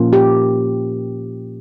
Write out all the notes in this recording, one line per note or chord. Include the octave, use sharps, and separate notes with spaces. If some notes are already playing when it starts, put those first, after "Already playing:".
Already playing: A#2 F3 A#3 C#4 F4
G4